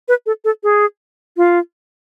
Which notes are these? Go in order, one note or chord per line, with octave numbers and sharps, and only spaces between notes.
B4
A4
A4
G#4
F4